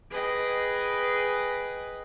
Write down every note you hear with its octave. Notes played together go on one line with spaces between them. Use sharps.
G#4 B4 D#5 G5